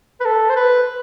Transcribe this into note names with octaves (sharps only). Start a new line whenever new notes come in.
B4
A4
C5
B4